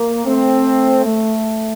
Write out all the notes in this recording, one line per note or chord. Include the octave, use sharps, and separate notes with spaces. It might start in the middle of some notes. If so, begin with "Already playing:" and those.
Already playing: A#3
A3 C4
A3